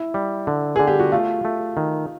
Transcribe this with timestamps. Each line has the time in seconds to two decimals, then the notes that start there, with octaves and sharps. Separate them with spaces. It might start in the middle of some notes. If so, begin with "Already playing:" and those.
Already playing: E4
0.14 G3
0.47 D3
0.76 D3 G#4
0.87 G4
0.99 F#4
1.12 A3 F4
1.45 A3
1.77 D#3